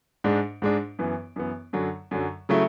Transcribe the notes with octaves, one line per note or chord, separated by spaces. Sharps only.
G#2 G#3 D4
G#2 G#3 D4
F#2 E3 B3
F#2 E3 B3
F#2 D3 F#3
F#2 D3 F#3
C#3 F#3 A3 E4